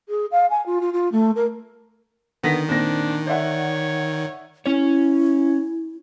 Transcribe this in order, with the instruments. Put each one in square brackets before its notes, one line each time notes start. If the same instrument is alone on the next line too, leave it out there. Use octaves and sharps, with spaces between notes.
[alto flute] G#4
F5
G#5
F4
F4
F4
A3
A#4
[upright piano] D3 A#6 B6 [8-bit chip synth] D#3 [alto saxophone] B3
[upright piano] A#2 C4 A#6 [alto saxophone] D4
[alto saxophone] C#5 [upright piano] D5 E5 F#5
[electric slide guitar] C#4 C#5 [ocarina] E4